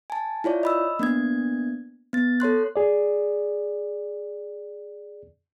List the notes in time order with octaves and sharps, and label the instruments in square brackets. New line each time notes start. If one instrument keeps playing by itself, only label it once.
[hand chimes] G#5 A5
E4 F4 C#5 D5
D#5 B5 E6
A#3 B3 D4 G#6
B3 A6
A4 C#5 C6 F#6
[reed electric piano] G#4 D5